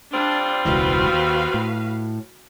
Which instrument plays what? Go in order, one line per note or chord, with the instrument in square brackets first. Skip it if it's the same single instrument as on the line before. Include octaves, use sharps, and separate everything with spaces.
[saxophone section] G3 C4 F4 [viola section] D4
[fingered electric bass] E1 C#2 E3 [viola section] F#4 B4 F5
[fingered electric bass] D#2
A2